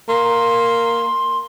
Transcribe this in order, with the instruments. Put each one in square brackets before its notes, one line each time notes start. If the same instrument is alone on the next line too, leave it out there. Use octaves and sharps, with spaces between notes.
[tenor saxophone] A#3 [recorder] C6